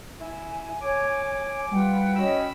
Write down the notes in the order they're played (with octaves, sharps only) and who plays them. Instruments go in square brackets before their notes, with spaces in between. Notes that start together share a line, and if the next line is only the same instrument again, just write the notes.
[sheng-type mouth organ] E4 [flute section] G#5
[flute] C#5 [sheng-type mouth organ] D6
[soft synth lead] G3 [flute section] F4 B4 F#5 [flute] G5
[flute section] C#4 F#4 D#5 [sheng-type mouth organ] B5 E6